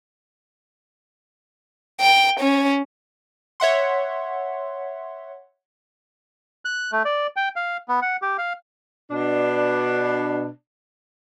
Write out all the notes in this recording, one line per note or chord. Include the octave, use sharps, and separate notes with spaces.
G5
C#4
C#5 E5 F#5 C6
F#6
A3
D5
G5
F5
B3
F#5
G4
F5
B2 D4